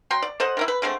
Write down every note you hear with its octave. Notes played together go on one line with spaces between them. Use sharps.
F#3 G5 C6
D5
A4 C5 D#5 F#5
D#3 A#3 E4
B4
D3 G#3 A3 C4